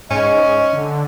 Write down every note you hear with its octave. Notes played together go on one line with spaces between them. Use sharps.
G#2 C#4 D#5
D3